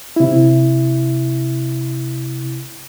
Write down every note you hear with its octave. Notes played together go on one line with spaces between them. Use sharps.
C3 E4